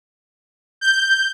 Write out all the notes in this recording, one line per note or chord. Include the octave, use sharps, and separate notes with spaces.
G6